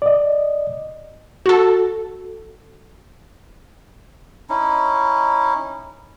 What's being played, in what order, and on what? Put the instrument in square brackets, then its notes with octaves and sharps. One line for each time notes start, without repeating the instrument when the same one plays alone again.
[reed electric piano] D5 D#5
[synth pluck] F#4 A4
[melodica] C#4 D#4 E4